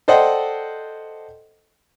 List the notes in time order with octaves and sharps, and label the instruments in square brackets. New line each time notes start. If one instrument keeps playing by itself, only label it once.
[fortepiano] A4 C5 D5 D#5 F#5 G5